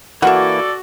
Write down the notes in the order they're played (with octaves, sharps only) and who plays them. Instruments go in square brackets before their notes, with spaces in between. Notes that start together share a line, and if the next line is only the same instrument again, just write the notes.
[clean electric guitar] E3 A#3 [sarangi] F#4 [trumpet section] A4 D5 [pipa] E5 F#5